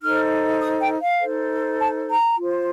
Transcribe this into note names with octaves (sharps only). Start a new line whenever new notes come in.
D#4 A4 C5 F6
D#6
G5
F5
D#4 A4 C5
A5
A#5
F4 C5